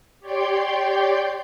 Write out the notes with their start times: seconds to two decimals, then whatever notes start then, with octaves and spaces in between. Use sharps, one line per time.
0.20 G4 C#5 D5 G5 C6 G6